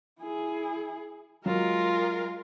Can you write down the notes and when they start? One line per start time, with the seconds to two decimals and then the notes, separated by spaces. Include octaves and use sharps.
0.20 E4 G#4
1.46 F#3 G#3 F4 A#4